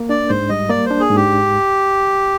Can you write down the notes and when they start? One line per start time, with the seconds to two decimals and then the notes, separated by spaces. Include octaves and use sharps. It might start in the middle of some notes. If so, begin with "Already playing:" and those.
Already playing: A#3
0.09 D4 D5
0.29 G#2 C5
0.49 G3 D#5
0.69 A#3 D5
0.86 D4 C5
1.00 G#4
1.10 G#2
1.16 G4